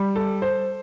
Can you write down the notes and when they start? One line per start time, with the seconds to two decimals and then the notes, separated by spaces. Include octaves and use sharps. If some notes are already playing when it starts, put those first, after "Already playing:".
Already playing: G3
0.16 A4
0.42 C5